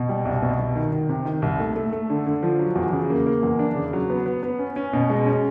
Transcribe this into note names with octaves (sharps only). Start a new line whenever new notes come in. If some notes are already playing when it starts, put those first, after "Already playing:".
Already playing: B2
G3
C2
B2
C2
D#3
D#3
C3
D#3
C2
A3
A3
A3
D3
D3
F3
F#3
E2
C#3
A#3
A#3
E2
D4
C#3
F#3
B3
B3
B3
C#4
C#4
B2
G#3
C#4